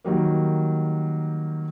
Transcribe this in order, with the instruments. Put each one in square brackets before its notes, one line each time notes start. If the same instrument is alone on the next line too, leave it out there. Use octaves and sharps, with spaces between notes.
[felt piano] D#3 F#3 G3 A#3